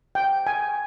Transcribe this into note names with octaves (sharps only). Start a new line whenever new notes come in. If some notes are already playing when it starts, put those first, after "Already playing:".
G5
G#5